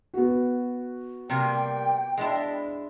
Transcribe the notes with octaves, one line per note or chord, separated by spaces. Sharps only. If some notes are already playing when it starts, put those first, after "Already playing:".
B3 F#4
C3 G3 A#3 G5
G#3 D4 E4